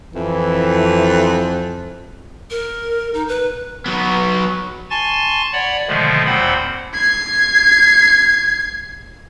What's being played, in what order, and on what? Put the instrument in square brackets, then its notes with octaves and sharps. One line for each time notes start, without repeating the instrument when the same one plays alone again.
[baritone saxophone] F2 [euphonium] E3
[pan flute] A#4
D#4
B4
[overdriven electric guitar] F#3 B3
[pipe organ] G#5 A5 C6 C#6 A6
C#5 D5 F#5 B5
B2 D3 D#3 F3 G#3 A3
D#2 A#2 C4 C5 F#5 B5
[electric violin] G#6 C7